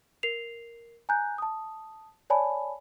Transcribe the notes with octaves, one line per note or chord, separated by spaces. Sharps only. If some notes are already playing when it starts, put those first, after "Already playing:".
A#4 C7 F7
G#5 A#5 F#6 G6
A5 D#6
C#5 D5 G#5 A5 B5